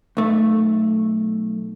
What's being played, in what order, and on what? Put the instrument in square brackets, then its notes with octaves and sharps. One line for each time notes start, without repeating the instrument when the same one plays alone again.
[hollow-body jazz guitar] B1 A3